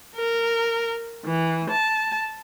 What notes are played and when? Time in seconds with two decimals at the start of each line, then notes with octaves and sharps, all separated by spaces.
0.15 A#4
1.25 E3
1.70 A5